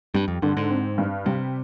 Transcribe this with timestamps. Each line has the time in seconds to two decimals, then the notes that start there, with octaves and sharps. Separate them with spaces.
0.14 G2 G3
0.28 F2
0.42 G2 D3
0.57 G#2
0.70 C4
0.98 G2
1.26 C3 G3